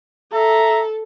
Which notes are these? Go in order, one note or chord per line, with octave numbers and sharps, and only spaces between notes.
A4 E5 A#5